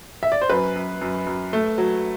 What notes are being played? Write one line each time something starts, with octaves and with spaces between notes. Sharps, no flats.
E5
D5
C5
F#2 B4
F#2
F#2
F#2
A3
F#3